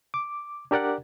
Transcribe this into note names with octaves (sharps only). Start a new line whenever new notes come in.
D6
D4 G4 A#4 D5 F#5